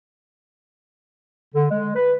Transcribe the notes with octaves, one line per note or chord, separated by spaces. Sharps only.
D3
G#3
B4